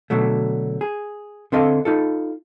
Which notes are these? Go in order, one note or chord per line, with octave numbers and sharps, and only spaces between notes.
B2 D3 F#3 A3
G#4
D3 C4 A4 D#5 F5
D#4 F4 A4